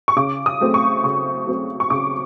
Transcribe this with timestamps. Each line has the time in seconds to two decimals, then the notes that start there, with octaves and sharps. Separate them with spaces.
0.08 C#6
0.16 C#3 D6
0.46 D#6
0.60 F#3 A3 C4
0.74 C#6
1.04 C#3 C#6
1.47 F#3 A3 C4
1.80 C#6
1.90 C#3 D6